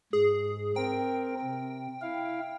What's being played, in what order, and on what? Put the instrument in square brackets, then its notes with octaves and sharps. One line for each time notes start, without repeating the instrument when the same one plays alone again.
[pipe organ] G#2 [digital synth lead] G#4
[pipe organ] C4 A#4 [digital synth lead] G5
[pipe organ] C3
E4 F5